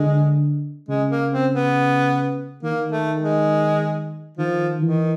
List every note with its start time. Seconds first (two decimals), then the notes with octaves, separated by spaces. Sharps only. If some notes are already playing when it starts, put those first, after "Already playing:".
Already playing: D3 G#3
0.89 C#3 G#3
1.11 A#3
1.32 C4
1.54 B3
2.63 D#3 A#3
2.92 A3
3.22 G#3
4.38 D#3 F3
4.82 D#3 E3